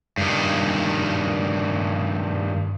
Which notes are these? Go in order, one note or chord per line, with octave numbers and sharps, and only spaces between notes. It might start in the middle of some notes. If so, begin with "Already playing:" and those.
G2 D#3